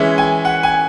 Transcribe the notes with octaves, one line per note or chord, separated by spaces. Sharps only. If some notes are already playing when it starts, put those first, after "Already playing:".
Already playing: E3 G#3 C#4 E5
G#5
F#5
G#5